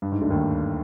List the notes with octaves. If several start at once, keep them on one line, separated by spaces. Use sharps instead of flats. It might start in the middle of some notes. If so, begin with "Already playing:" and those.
G2
G#2
D2 D3
D#2 D#3